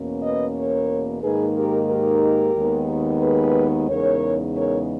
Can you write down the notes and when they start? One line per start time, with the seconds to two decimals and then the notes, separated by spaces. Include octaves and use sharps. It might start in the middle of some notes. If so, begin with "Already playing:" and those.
Already playing: E2 B2 A#3 C#4
0.23 B4 D#5
0.56 A#4 C#5
1.23 G#2 D#3 A#3 D#4 G#4 B4
1.55 G4 A#4
1.89 G4 A#4
2.56 D#2 D#3 G#3 B3 D#4
3.22 G#4 B4
3.89 E2 C#3 G#3 B3 D#4 A#4 C#5
4.56 A#4 C#5